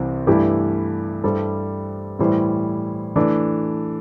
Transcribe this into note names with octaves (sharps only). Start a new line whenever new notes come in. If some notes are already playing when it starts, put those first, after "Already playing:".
Already playing: C2 C3 E3 C4
G2 E3 A3 E4 G4
G2 G3 E4 A4 C5
A2 E3 G3 E4 C5
E3 A3 D4